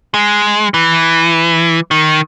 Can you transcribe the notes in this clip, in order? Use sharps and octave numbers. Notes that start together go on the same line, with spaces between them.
G#3
E3
D#3